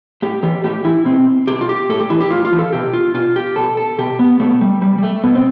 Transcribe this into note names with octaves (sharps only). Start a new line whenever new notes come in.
A2 G4
E3 G4
A2 G4
E3 E4
B2 C4
B2 G4
F4
G4
A2 A4
G4
E3 E4
G4
A2 F4
F4
E3
A4
B2 G4
F4
B2 F4
G4
B2 A4
A4
B2 G4
B3
B2 A3
G3
B2 G3
G3
A3
B2 B3
C4